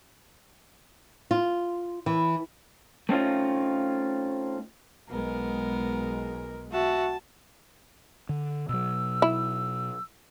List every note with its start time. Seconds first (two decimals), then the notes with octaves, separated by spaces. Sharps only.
1.31 F4
2.06 E3
3.09 A3 C4 C#4 D#4 F4
5.10 B1 G#3 B3 A#4
6.72 F#4 E5 A5
8.29 D3
8.69 B2 F#3 E6
9.22 E4